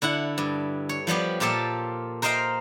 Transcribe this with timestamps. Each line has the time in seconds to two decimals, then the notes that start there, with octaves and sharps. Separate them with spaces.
0.02 D3 E4 F#5
0.38 G2
0.89 C#5
1.07 F3 G3 B3 G4
1.40 A#2 F4 G4 A4 A5
2.22 A#4 C5 D#5 F5 G5 A#5